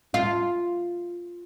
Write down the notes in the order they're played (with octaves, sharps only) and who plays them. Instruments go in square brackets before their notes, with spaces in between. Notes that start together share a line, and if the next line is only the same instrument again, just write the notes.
[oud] F4